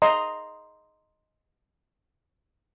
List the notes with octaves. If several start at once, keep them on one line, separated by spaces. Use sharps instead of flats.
D#5 A#5 C6